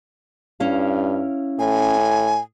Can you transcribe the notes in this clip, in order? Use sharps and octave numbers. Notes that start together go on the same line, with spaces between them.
G2 C#4 E4 F5
A2 G#5